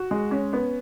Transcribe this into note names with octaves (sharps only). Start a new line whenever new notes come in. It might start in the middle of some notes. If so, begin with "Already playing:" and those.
Already playing: F#4
G#3
C#4
B3